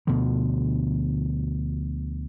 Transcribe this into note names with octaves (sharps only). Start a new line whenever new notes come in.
D2 B2 D3 F3